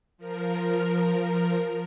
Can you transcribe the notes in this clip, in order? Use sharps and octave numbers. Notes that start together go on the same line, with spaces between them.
F3 A#4